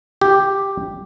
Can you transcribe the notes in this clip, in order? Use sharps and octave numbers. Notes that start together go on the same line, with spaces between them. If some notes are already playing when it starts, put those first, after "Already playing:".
G4